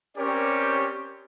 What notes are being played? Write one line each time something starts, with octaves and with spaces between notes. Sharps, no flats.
C4 C#4 G4 A#4 C#5 D5